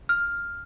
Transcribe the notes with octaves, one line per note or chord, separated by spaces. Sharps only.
F6